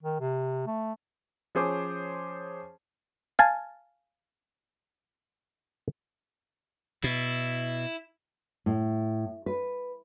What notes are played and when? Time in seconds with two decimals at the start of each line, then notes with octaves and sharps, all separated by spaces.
0.03 D#3
0.20 C3
0.67 A3
1.55 F3 C#4 G#4 C5 C#5 D6
3.39 F5 G#5 A5
7.04 B2 E4
8.66 A2
9.46 B4